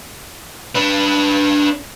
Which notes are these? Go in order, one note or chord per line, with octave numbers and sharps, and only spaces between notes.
D4 B4